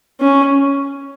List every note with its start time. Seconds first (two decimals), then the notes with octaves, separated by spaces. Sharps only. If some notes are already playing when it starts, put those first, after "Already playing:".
0.20 C#4